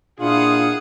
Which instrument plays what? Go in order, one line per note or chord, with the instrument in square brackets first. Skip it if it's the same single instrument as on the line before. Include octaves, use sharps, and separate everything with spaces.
[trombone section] A#2 D4 [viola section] E4 F5 [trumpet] F4 [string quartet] G#4 F#5 D#6